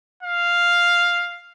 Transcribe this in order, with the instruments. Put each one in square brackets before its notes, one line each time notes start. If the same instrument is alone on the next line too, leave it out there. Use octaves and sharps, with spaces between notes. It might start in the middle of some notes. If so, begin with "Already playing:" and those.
[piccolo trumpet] F5